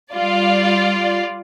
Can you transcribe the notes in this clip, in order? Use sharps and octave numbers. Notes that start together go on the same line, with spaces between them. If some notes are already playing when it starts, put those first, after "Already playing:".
G3 F4 D5